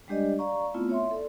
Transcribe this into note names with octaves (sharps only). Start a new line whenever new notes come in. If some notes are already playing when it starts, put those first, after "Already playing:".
G3 G#3 D4 G4 D5 D#5
D5 F5 A#5 C#6
A3 B3 C4 E4 F4
C#5 E5 C6
A4 D5